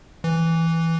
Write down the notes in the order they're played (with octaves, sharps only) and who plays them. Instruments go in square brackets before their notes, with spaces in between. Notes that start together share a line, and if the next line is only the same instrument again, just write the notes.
[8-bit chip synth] E3